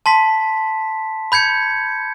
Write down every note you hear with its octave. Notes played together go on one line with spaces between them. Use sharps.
A5 C6 B6
B5 G6 G#6 C#7